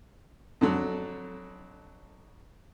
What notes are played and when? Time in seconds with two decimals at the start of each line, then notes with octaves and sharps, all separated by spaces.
0.61 F2 D3 F#3